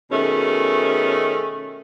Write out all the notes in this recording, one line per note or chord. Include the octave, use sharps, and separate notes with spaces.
B2 D#3 A3 C#4 G#4